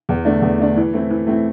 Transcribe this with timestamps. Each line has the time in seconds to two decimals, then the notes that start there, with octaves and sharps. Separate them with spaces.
0.09 E2
0.25 D3 A3 D4
0.42 E2
0.59 D3 A3 D4
0.76 E3
0.94 A3 C4 E4
1.10 E3
1.27 A3 C4 E4